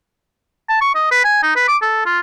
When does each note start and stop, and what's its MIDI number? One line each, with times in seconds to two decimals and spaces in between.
0.69 0.79 81
0.81 0.94 85
0.95 1.08 75
1.12 1.24 71
1.25 1.39 80
1.43 1.54 63
1.56 1.67 71
1.68 1.77 86
1.82 2.03 69
2.06 2.20 65